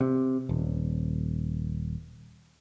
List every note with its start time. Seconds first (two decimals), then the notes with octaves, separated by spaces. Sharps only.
0.01 C3
0.49 D#1